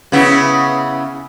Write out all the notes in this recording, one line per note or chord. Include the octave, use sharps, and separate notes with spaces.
C#3 B3 E4